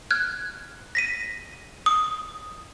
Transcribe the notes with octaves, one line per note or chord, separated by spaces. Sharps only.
F6 F#6 G#6
A#6 B6 D#7
D#6